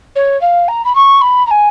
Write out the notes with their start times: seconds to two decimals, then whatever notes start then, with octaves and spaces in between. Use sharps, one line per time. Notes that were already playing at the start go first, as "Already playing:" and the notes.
0.15 C#5
0.41 F5
0.68 A#5
0.84 B5
0.95 C#6
1.21 B5
1.47 A#5
1.51 G#5